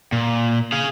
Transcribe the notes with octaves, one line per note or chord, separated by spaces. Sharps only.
A#2
G#4 F5